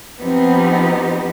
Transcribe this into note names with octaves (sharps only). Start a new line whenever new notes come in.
F3 B3 C4 D#4 G4